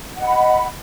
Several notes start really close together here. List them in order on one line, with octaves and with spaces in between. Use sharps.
F#5 D#5 B5